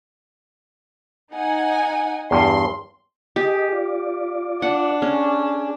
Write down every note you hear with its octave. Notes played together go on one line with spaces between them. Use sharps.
D#4 F#5 G#5
E2 G2 C6
G4 G#4 D#5
F4 D5
D4 F#5
C#4 G#4